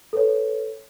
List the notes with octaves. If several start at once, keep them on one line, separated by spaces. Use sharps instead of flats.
A4 B4 C#5